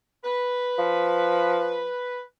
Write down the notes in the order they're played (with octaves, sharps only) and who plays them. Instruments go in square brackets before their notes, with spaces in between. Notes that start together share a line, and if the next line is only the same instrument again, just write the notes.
[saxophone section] B4
[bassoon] F3